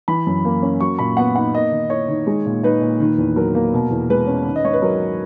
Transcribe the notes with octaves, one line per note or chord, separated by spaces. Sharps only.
E3 B5
F#2
A#3
C#4
F#3 C#6
A#2 B5
B3 F#5
D#4 F#5
A#3 D#5
D#3
E4 C#5
D#3
G#3
A#2
D#4 B4
A#2
D#3
E2
F#3 A#4
A#3
B2
E2
G#3 B4
C#4
D#3
D#5
G#2 C#5
B4
F#3 A#4